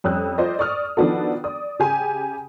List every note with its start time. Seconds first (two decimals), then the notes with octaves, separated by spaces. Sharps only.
0.04 F2 G3 C#4 D#6 E6 F#6
0.38 F4 C5 D5 D#5
0.59 D5 C#6 D#6 F6
0.97 D#3 F3 B3 D4 F#4 A4
1.44 D5 D#6
1.79 C#3 G4 G#5